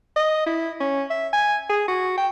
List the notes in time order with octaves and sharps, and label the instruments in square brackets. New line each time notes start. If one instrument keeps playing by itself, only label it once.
[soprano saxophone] D#5
E4
C#4
E5
G#5
G#4
F#4
G5